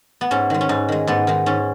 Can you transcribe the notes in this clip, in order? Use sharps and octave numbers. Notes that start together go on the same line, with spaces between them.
B3
G#2 C#4
D#3 G#3
C#4
G#2 D#4
D#3 G#3
G#2 B3
D#3 G#3
G#2 C#4